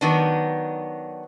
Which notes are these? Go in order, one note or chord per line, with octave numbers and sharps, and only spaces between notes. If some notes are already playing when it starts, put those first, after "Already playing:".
D#3 F#3 B3 D4